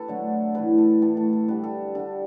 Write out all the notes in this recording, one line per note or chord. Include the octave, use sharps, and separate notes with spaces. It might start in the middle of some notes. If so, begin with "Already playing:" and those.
Already playing: A4 B4
D3 F#3 A3
A2 E3 A3 B4
A4
A2 E3 A3 A4
A4
A4
D3 G3 B4
A4
D3 G3 A4